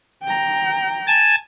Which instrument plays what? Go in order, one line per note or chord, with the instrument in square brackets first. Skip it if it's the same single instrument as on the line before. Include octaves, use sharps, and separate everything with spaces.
[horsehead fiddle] G5 A#5
[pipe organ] G#5 A5